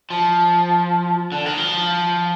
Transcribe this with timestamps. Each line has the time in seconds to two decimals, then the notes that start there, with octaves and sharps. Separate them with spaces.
0.10 F3
1.32 D3
1.46 D#3
1.57 F3